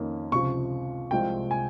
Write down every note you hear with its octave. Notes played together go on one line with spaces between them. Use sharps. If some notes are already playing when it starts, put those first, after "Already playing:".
Already playing: F2 D#3 A#3 C#4
C#2 C3 F3 C#6
C2 C3 F3 G#3 C4 G5
G#5